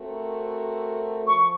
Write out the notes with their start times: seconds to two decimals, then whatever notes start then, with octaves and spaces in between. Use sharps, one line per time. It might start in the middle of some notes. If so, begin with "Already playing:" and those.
Already playing: A3 C4 F#4 A#4
1.27 F3 C#6